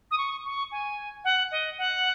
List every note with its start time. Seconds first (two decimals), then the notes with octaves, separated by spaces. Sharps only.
0.11 D#6
0.18 C#6
0.45 C#6
0.72 G#5
1.24 F#5
1.51 D#5
1.78 F#5